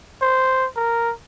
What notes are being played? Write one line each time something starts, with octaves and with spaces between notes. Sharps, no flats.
C5
A#4